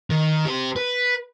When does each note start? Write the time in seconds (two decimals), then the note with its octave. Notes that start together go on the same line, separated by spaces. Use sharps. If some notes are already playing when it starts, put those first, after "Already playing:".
0.10 D#3
0.45 G4 C5
0.76 B4